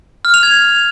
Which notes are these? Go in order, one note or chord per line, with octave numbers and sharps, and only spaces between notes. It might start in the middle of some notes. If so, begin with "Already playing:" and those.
F6
F7
G#6